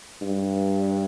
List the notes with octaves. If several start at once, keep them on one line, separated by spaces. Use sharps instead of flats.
G2